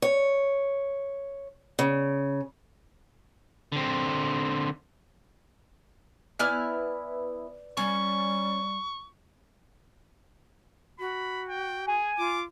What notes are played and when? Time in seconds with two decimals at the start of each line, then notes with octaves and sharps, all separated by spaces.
0.02 C#5
1.79 C#3
3.72 D3 C4
6.39 B3 E4 B4 D5 G#5 F6
7.77 G3 C#4 C#6
10.99 F#4 B5
11.49 G5
11.88 G#4 G#5
12.18 F4 D6